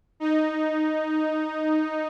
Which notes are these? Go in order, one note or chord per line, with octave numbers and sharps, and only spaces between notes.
D#4